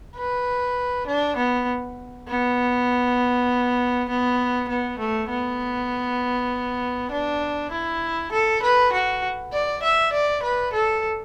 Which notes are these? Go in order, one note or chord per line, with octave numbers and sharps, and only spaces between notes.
B4
D4
B3
B3
B3
B3
A3
B3
D4
E4
A4
B4
F#4
D5
E5
D5
B4
A4